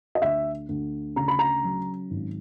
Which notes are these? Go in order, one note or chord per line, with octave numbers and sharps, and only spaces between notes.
D#5
D2 E5
D2
C#3 A#5
B5
A#5
F#3
G#1